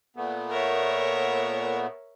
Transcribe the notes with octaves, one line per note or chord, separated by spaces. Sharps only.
A#2 A3 B3
A#4 C#5 E5